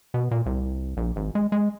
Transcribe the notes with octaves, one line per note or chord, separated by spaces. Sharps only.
B2
A#2
C2
A#1
G#1
G#3
G#3